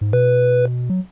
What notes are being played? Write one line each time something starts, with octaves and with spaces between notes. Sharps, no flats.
G#2
B2 B4
F#3